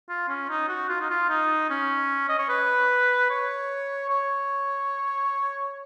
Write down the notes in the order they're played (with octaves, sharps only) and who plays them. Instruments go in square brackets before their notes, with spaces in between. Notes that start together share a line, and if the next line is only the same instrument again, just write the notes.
[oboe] F4
C#4
D#4
F#4
F4
D#4
F4
D#4
C#4
D#5
C#5
B4
C#5
C#5